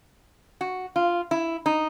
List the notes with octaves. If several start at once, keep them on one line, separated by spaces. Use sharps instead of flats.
F#4
F4
E4
D#4